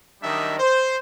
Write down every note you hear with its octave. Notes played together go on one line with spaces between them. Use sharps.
D#3 F#3 G3 D4 D#5 E5
C5